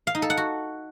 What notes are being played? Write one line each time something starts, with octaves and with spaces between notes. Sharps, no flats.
F5
D#4
A4
F#5
F#4